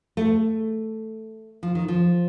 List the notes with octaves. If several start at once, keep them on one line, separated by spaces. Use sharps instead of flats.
A3
F3
D#3
F3